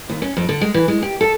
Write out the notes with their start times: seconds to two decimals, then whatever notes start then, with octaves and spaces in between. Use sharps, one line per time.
0.10 D#2
0.22 C#4
0.37 F2
0.49 D3
0.61 G#3
0.74 E3
0.88 G#3
1.02 G4
1.21 A4